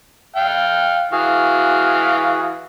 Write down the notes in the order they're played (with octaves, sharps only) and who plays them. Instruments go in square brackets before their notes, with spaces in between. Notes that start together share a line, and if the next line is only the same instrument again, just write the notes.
[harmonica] F5 G5
[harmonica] E3 F5 [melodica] F#4 G#4